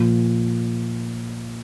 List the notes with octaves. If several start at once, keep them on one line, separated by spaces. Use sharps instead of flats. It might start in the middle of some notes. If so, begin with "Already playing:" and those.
Already playing: A#2 F3